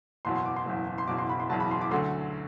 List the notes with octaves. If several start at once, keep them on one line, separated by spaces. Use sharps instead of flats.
F#1 E2 B2 F#3 C6
C6
D6
C6
F#1 E2 B2 F#3
C6
F#1 E2 B2 F#3 D6
C6
B5
C6
F#1 E2 B2 F#3 A5
B5
C6
D6
D2 D3 F#3 A3 C6